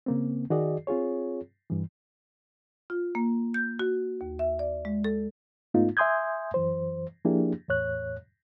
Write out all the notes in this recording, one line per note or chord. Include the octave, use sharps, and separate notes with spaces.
C#3 A#3 C4
D#3 F#4 G#4 D5 D#5
C4 F4 G#4 C#5
G2 E3
F4
A#3
G6
F#4
D#2
E5
D5
G#3
A4
G#2 A3 B3 D#4 F4
E5 G#5 C6 D#6 G6 G#6
F#2 E3 C5
F3 A#3 D4 E4 G4 G#4
E2 A2 C#5 F#6